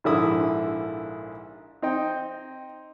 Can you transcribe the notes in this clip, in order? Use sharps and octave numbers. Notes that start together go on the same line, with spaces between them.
A#1 G#2 D3 E4 D#6
C4 D#4 G5